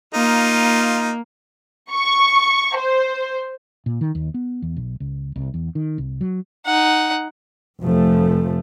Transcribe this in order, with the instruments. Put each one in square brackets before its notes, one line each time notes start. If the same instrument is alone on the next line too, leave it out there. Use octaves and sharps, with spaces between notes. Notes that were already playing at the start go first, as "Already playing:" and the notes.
[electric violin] A#3 [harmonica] D#4 F4
[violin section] C#6
C5
[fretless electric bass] A#2
D#3
D#2
B3
E2
B1
C#2
C2
E2
D#3
C2
F#3
[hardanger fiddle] D#4 F#5
[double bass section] F1 F3 A3